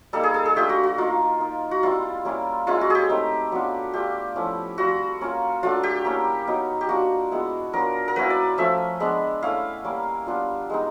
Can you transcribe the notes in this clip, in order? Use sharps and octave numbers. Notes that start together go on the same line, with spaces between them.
G3 A#3 D#4 A4
G#4
A4
G#4
A3 D4 F4 G4
F#4
F#4
A#3 D#4 F4
A#3 D#4
F#4
G3 C4 E4 F4
G3 A#3 C#4 E4
G#3 C#4 E4 F4
F#4
G4 G#4
A3 C4 D#4
F#3 B3 D4 F4
A3 D4 F4 G4
F3 A3 C#4 E4
G3 C4 F4 F#4
A#3 C#4 F4
F#3 A3 D4 F4
G4
A#3 C#4 E4
F#3 B3 D#4
G4
A#3 D4 F4 F#4
G#3 B3 E4
F#3 B3 D4 F4 A#4
A#4
F#3 A#3 C#4 E4 B4
D5
F3 A3 C#4 E5
G#3 B3 D4
A3 C#4 E4 F5
G3 A#3 C#4
G3 B3 D4 F4
G#3 B3 D#4